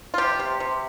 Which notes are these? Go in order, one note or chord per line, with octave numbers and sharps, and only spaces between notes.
F4
C3 G4
C3
C3